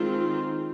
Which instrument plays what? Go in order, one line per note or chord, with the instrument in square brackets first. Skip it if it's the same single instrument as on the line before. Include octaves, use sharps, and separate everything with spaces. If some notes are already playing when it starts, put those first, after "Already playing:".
Already playing: [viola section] D#3 G#3 C4 F4